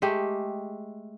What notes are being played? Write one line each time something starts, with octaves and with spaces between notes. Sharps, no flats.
G#3 A3 G4